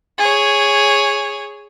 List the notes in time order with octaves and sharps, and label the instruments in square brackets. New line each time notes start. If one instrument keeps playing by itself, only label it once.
[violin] G#4 C#5